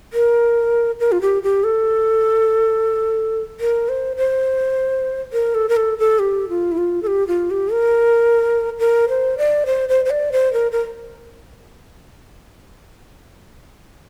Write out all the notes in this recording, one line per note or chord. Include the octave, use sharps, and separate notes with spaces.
A#4
A#4
F4
G4
G4
A4
A#4
C5
C5
A#4
A4
A#4
A4
A4
G4
F4
E4
F4
A4
G4
F4
G4
A#4
A#4
C5
D5
C5
C5
C5
D5
C5
A#4
A#4